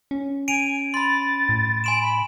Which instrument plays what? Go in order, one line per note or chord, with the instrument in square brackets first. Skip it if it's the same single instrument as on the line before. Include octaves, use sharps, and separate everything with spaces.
[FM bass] C#4
[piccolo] G#5 [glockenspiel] D7 D#7 F7
[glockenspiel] B5 C6 [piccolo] A6
[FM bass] A2
[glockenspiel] G#5 C6 E7 [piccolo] D7
[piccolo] B5